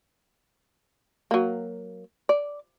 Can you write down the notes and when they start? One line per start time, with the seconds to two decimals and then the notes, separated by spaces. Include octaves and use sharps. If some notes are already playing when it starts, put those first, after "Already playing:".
1.31 F#3 A#3
2.29 D5